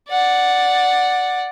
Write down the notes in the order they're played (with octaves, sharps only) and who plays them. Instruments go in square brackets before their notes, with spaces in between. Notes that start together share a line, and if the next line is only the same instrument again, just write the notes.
[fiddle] D5 F#5